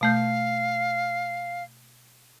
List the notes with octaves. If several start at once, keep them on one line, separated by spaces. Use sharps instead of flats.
B2 A3 F5 G6